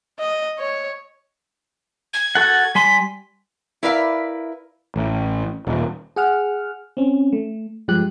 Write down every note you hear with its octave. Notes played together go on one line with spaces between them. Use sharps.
D#5
C#5
G#6
F#4 A4 F#5
G3 G#5 C6 B6
E4 A#4 B4 D5 E5 F5
A1
D#1
G#4 F#5 F6
C4 C#4
A3
G2 F3 G#3 G4 F#6